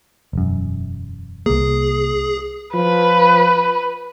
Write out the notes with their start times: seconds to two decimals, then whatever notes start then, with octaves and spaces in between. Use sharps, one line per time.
0.33 E1 F#2
1.46 C2 A#3 G#4
2.74 F3 B4